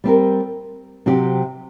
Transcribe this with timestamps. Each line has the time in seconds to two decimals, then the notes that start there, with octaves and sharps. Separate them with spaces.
0.04 G3 C4 G4 A#4
1.06 C3 F#3 C4 G4